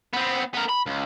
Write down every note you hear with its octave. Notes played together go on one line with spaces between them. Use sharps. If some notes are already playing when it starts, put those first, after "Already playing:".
B3 C4
B3 A#4
B5
C#2